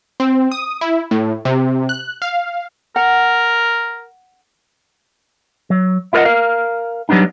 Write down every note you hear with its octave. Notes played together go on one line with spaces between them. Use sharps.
C4
D#6
E4
A2
C3
F#6
F5
A#4 F#5
F#3
E4 F4 A#4 D5 D#5 F#5
A#4 F5
F#3 G3 B3 D4 D#4